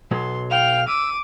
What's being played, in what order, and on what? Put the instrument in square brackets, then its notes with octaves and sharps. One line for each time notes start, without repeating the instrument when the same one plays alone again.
[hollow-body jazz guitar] B1 F#3 B3 [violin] C6
[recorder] F5 [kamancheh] G5 [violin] F6 F7
[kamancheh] D6 [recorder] E6 [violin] D#7